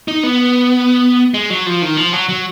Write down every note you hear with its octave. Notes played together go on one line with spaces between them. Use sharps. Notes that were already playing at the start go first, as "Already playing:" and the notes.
D#4
B3
G#3
F#3
F3
D#3
F3
F#3
F#3